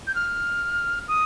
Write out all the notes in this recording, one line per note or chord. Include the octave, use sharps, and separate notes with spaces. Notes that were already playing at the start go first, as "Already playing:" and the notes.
G6
F6
D#6